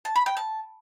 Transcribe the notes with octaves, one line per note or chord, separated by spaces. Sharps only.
A5
B5
G5
A5